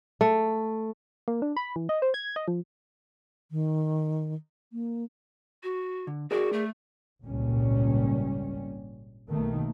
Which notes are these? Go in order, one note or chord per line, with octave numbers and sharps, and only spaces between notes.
A3
A#3
D4
B5
E3
D#5
C5
G#6
D#5
F3
D#3
A#3
F#4
D3
F#4 G#4 A#4 D5
A3
G#1 C#2 A#2 G3 C#4
B1 B2 D#3 A3 A#3